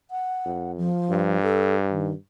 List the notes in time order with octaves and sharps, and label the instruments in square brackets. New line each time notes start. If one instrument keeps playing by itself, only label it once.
[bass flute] F#5
[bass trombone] F2
[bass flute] F3
[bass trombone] G2
[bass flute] A4
D#3